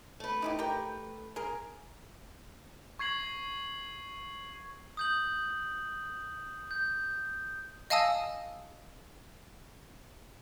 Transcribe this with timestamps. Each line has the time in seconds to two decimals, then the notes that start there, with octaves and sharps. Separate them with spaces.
0.20 A3 B4
0.42 D#4 E4 G4
0.59 G4 A#4 G5
1.36 G#4 A#4
2.99 C#6 G#6 C7 F#7
4.97 D#6 G6 F#7
6.71 G6
7.90 D#5 F5 G#5 A5 D#6 E6